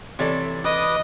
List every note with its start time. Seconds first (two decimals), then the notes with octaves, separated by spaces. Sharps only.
0.19 C3 E3 A4 C#5 D5
0.65 B4 D#5 D6 D#6